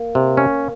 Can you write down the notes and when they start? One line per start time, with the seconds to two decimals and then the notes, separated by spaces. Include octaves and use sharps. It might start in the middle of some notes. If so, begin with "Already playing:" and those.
Already playing: A#3
0.15 C3
0.37 C#4